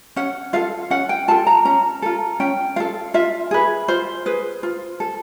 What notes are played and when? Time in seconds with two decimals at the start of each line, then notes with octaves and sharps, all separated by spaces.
0.16 C#4 F#5
0.53 F4 A4 F5
0.90 C#4 F#5
1.09 G5
1.28 F4 A4 A5
1.47 A#5
1.65 C#4 A#5
2.02 F4 A4
2.40 C#4 G5
2.76 F4 A4 F5
3.14 F4 E5
3.51 G#4 B4
3.88 F4 C5
4.26 G#4 B4
4.63 F4
5.00 A4